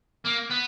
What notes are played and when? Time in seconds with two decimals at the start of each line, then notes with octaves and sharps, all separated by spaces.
0.26 A#3
0.51 B3